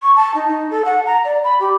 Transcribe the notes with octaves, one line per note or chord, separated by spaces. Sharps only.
C#6
A5
D#4
D#4
A4
F#5
A#5
D5
B5
G4